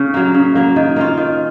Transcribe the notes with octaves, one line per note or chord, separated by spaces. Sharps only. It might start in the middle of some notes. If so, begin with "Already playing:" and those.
Already playing: C#3
F#3 A#3
C#3
F#3 A#3
D#3
A#3 C#4 F4
D#3